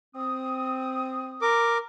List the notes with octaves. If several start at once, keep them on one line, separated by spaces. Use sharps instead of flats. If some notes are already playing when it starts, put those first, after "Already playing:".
C4 D#6
A#4 D6